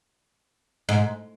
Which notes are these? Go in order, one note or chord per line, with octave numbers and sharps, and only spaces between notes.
G#2